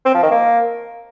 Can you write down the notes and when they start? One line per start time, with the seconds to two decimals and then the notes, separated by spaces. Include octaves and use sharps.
0.05 C4
0.14 F3
0.23 D#3
0.31 A#3